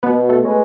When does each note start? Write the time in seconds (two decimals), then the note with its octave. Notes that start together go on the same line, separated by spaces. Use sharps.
0.03 B2 B3 B4
0.29 A3 A4
0.42 G#3 C#4 G#4 B4